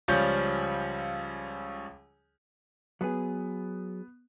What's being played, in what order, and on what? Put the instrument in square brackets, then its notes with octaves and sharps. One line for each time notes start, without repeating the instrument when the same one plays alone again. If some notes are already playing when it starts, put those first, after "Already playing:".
[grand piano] C#2 F3 G3 C#4 C#5 G6
[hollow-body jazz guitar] F#3 G#4 [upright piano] B3